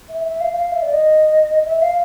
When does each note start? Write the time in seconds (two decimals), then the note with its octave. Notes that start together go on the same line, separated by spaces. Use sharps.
0.09 E5
0.25 E5
0.41 F5
0.56 F5
0.72 E5
0.82 D5
0.93 D#5
1.66 E5
1.82 F5